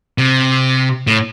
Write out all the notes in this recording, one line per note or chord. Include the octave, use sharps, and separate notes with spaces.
C3
A2